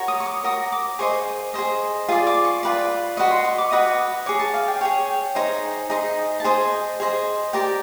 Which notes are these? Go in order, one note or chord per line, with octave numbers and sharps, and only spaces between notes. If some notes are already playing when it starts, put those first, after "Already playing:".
Already playing: F#4 A#4 C#5
D#6
C#6
D6
F#4 A#4 D#6
D6
G#4 C5 D#5 C#6
G#4 C5 D#5
F4 G#4 D5
D6
C#6
F4 G#4 B4 D5
F#4 B4 D#5 C#6
C6
C#6
D6
F#4 B4 D#5 D#6
G#4 C#5 D6
A5
F5
G5
G#4 C#5 G5
D#4 G#4 C5 D#5 G#5
D#4 G#4 C5 D#5
A5
G#4 C5 D#5 G#5
G#4 C5 D#5
G4 A#4 D5 G5